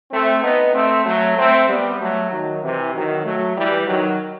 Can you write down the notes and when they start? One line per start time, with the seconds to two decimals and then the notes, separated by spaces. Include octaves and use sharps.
0.11 A3 C4
0.43 B3 D#4
0.74 A3 C4
1.05 F#3 A3
1.37 A3 C4
1.68 G3 B3
2.00 F#3 A3
2.32 D#3 F#3
2.62 C3 E3
2.94 D#3 F#3
3.25 F#3 A3
3.57 E3 G3
3.88 D#3 F#3